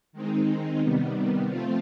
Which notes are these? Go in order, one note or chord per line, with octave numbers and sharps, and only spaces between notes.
D#3 G#3 C4 D#4
C3 D#3 G3 B3
F3 A3 C4 F4